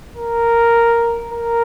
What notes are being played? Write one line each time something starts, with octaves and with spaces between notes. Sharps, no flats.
A#4
A#4